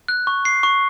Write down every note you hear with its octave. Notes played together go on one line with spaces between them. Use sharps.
F#6
C#6
C7
C#6